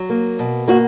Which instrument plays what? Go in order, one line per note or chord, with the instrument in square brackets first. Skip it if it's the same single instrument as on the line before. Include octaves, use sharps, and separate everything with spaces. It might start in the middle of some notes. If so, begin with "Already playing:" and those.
Already playing: [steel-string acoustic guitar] F#3
A#3
B2
A#3 F#4